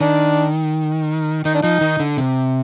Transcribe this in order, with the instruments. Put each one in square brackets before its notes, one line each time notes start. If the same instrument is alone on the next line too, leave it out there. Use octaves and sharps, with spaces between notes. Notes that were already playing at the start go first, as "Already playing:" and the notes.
[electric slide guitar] D#3 [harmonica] D4
[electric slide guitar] D#3 [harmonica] D#4
[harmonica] D4
[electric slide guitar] F3 [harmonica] D#4
[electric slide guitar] D#3
D3
C3